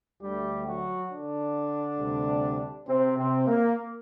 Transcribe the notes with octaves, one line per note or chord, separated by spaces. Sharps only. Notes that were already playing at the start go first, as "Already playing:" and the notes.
D2 D3 G3 A3 G4
F#3 F#4
D3 D4
D2 C3 G3
C3 C4
C3 C4
A#3